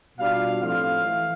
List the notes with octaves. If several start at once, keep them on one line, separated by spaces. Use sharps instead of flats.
B2 G3 D4 F4 F5
A2 F3 C4 F4 F5
E3 A3